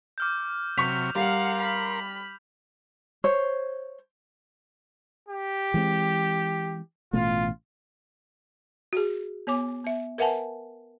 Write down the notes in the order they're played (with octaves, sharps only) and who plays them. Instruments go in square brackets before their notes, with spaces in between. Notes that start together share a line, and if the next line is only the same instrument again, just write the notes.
[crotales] D6 F6 G6
[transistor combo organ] C3 F#3 [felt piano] C#6 B6 [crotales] F7
[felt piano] G3 [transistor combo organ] A#4 C6 [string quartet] F5 F#5
[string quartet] B5
[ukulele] C5 C#5
[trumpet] G4
[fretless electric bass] E3 G#3 C4
[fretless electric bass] A1 B2 A3 [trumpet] F4
[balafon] F#4 G#4
B3 C#5 G#5 D6
B3 E5
A#4 B4 E5 F#5 G#5 A5